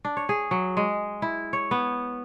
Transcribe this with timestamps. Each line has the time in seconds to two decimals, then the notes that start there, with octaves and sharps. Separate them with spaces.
0.05 D4
0.17 C#5
0.29 G#4
0.51 F#3
0.77 G#3
1.22 E4
1.53 C#5
1.71 B3